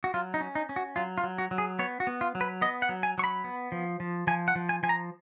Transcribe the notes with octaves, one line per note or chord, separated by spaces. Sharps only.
F#4
F#3 F4
D#4
C#4
D#4
C#4
F#4
F#3 F4
F4
F#3
F#4
F#3
G#4
B3 C#5
F#4
B3
F4
F#3
B4
B3 D#5
F#5
F#3
G#5
F#3 C#6
B5
B3
F3
F3
F3 G#5
F#5
F3
G#5
F3 G#5
A#5